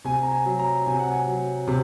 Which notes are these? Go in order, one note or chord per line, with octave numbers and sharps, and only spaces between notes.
C3 G#5
A#5
G#5
F#3
A#5
C3 G#5
F#5
G#5
F#3
C3